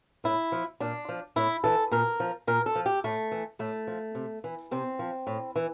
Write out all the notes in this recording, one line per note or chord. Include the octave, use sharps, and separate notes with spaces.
A2 E4
F3
A#2 D4
F3
A2 E4
E3 A4
A#2 A#4
F3
A#2 A#4
A4
F3
G4
A2 A3
E3
A2 A3
F3
C3
E3
C3 C4
F3
A2
E3